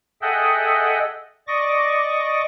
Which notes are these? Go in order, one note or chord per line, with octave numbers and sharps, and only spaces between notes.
G#4 A4 D#5 E5 F#5 G5
D5 D#5 C#6 D6 A#6